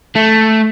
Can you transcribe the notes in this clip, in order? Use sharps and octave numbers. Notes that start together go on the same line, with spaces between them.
A3